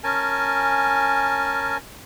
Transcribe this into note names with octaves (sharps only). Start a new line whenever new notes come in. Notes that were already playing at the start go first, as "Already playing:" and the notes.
C#4 A#4 G#5 A5